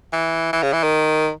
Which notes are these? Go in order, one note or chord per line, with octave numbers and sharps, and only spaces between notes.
E3
E3
C#3
E3
D#3